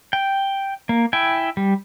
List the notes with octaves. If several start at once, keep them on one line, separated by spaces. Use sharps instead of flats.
G5
A#3
E4 G5 G#5
G3